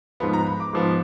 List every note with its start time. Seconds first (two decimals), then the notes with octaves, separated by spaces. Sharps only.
0.20 G#2 F3 B3 B5
0.33 A#5
0.47 B5
0.60 D6
0.73 G#2 F3 B3